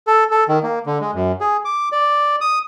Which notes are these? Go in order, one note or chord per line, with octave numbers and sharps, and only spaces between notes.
A4
A4
D#3
A#3
D3
G#3
F#2
G#4
D6
D5
D#6